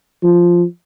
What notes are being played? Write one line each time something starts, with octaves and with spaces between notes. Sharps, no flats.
F3